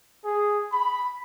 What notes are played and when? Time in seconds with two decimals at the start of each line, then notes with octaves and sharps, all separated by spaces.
0.25 G#4
0.72 B5